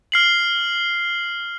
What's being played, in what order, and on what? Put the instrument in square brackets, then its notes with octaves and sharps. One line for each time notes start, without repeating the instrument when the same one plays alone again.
[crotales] F6 C7 F#7